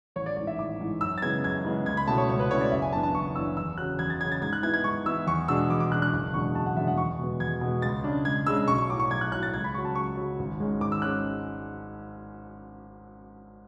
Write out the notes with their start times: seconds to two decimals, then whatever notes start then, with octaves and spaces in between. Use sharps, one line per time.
0.16 A1 C#5
0.26 D5
0.37 G#2 E3 D5
0.47 E5
0.59 A1 D6
0.80 G#2 E3
1.01 F#2 E6
1.18 A6
1.22 C#3 E3 G#3 B3 G#6
1.44 F#2 G#6
1.65 C#3 E3 G#3 B3
1.86 C#2 G#6
1.97 B5
2.07 B2 A3 C#4 E4 A5
2.18 C#5
2.29 C#2 C#5
2.40 B4
2.50 B2 A3 C#4 E4 C#5
2.61 D5
2.72 F#1 E5
2.82 G#5
2.93 F#2 E3 B3 D4 A5
3.03 A5
3.15 F#1 C#6
3.35 F#2 E3 B3 D4 E6
3.57 E2 E6
3.78 C#3 F#3 F#6
3.99 E2 G#6
4.10 A6
4.21 C#3 F#3 G#6
4.32 A6
4.41 G#2 G#6
4.53 F#6
4.63 E3 B3 E4 G#6
4.74 G#6
4.84 G#2 C#6
5.06 E3 B3 E4 E6
5.27 E2 C#6
5.48 B2 G#3 D4 E6
5.70 E2 D6
5.80 D6
5.92 B2 G#3 D4 F#6
6.02 F#6
6.13 F#1
6.33 E2 B2 G#3 D4 C#6
6.55 F#1 A5
6.66 F#5
6.77 E2 B2 G#3 D4 E5
6.88 F#5
6.97 E2 C#6
7.19 B2 G#3 B3
7.40 E2 G#6
7.61 B2 G#3 B3
7.82 C#2 A6
8.04 C#3 G#3 D4
8.25 C#2 G#6
8.46 C#3 G#3 D4 E6
8.68 B1 C#6
8.78 C#6
8.89 A2 F#3 D6
9.00 C#6
9.10 B1 G#6
9.21 F#6
9.32 F#3 F#6
9.35 A2
9.43 A6
9.53 C#2 G#6
9.64 B5
9.74 C#3 F#3 C#6
9.85 A5
9.95 C#2 C#6
10.17 C#3 F#3
10.39 G#1
10.60 G#2 G#3 C#4
10.81 G#1 D6
10.92 E6
11.02 G#3 C#4 F#6